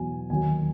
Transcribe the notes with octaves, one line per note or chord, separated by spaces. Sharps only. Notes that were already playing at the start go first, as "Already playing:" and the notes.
Already playing: E2 B2 F#3 G#5
D#2 D#3 F#3 G#5